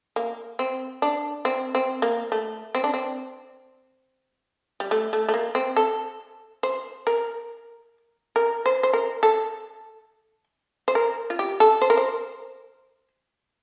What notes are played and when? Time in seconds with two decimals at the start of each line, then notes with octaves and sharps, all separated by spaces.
0.16 A#3
0.59 C4
1.02 D4
1.45 C4
1.75 C4
2.02 A#3
2.32 A3
2.75 C4
2.84 D4
2.94 C4
4.80 G3
4.91 A3
5.13 A3
5.29 A3
5.34 A#3
5.55 C4
5.76 A4
6.63 C5
7.07 A#4
8.36 A#4
8.66 C5
8.83 C5
8.93 A#4
9.23 A4
10.88 C5
10.95 A#4
11.30 F4
11.39 G4
11.60 A4
11.82 C5
11.90 A#4
11.97 C5